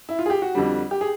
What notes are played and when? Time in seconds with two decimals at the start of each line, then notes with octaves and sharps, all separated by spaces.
0.09 E4
0.19 F4
0.26 G#4
0.30 G4
0.42 F#4
0.55 F2 D3 G3
0.91 G4
1.01 G#4